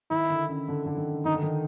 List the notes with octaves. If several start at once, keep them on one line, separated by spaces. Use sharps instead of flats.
D#3 E4
D3
C#3
D3
D3
D#3
D#3 D#4
D3
D#3